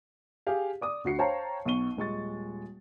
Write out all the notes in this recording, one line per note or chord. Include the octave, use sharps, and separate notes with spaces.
G4 G#4 F5
D5 D6 D#6
D2 F#4 C7 C#7
C5 C#5 F5 G5 A5 A#5
B1 B2 C#6 D#7 G7
D#1 G#3 C#6 A6